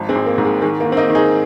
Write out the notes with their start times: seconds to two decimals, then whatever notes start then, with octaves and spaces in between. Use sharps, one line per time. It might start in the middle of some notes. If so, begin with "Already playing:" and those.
Already playing: G#1 F3
0.09 G#3 C4
0.15 G#1
0.26 A#3
0.38 G#2
0.45 G#3
0.62 D#3 G#3
0.80 A#3
0.85 D#3
0.92 C4
0.97 A#3 D#4
1.09 D#3
1.15 D#4 G#4